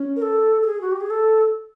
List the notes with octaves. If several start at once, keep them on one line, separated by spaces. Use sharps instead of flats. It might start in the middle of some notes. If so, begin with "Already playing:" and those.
Already playing: C#4
A#4
A4
A4
G#4
F#4
G4
G#4
A4